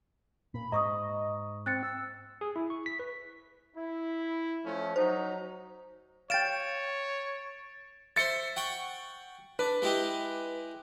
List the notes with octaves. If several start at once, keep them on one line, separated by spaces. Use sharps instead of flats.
A#2 B5
G#2 D#5 A#5 C#6 D#6
C4 F#6 A6 C#7
E6
G#4
E4
C#6
B6
B4
E4
F3 A3 C#4
F#3 D#4 C5
C#5 F5 G5 A6 D7 E7
C5 E5 A6 C#7
F#5 G5 C#6
D4 B4
G#3 E4 G4